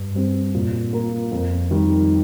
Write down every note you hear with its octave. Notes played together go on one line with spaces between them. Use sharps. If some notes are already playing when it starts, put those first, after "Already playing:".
Already playing: G2
G3 C4
A#2
A#3 F4 A#4
F2
D#3 G3